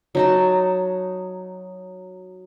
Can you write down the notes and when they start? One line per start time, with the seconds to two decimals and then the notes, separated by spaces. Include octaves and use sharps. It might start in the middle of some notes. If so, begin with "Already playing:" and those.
0.15 F#3 D#4 A5